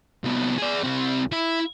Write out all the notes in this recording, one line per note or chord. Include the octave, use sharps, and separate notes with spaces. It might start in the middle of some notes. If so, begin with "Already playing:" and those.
C2 B3
G#4 D5
C2 C4
E4